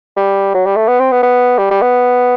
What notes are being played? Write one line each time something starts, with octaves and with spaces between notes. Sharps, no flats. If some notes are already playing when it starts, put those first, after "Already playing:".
G3
F#3
G3
A3
B3
C4
B3
B3
G3
G3
B3